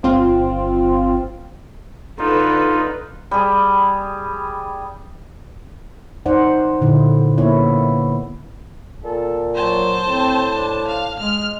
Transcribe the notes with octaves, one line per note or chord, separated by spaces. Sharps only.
G1 C4 F4
D3 D#4 F4 B4
G3 G#4
D#4 C5 D5 F#5
A#2 D3 E4
A#3 B3 E4 C#5
A#2 A4
F#3 C5 A5
A2 C4
D4
F5
G#3 F6